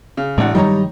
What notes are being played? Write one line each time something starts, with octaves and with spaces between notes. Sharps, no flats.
C#3
A1 A2 G#3 C4 D4 F#5
G2 D#3 F#3 G3 D#4 C#5 A#5